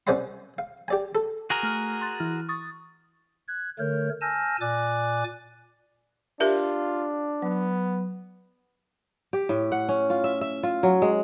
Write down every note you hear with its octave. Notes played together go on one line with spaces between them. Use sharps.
C2 C#4 C5 D5 F#5 C6
F5
G4 D5 G#5
A4
F#4 G#4 A#4
A3 F6
C6 F#6 A6
E3 E4 F6
C#6 D#6 A6
F#6 G#6
D3 A3 A#4 C#5 G6
G#5 A5 E6 F6 G6 A#6
A#2 D5 G#5 D6 F#6
D4 F4 G4 A#4 E5
F#3 B3
G4
A2
F#5
C#4
F4
E5
E5
F4
F#3
G#3